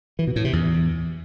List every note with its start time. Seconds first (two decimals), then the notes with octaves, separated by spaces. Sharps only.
0.19 E3
0.27 B2
0.36 A2
0.44 C3
0.53 E2